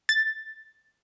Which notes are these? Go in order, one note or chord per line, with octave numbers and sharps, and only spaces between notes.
A6